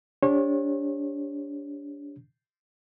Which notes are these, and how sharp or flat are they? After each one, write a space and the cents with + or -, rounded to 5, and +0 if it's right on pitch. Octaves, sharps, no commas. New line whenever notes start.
D4 -30 G4 +20 C#5 -35